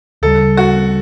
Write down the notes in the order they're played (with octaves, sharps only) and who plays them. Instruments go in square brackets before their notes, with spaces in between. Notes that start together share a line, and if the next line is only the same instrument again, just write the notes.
[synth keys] D2 C#3 G3 [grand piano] A4
[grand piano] F#4